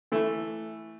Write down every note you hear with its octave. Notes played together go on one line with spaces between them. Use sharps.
E3 A3